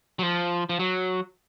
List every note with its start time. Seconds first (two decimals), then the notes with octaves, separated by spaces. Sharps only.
0.19 F#3
0.23 F3
0.69 F3
0.79 F#3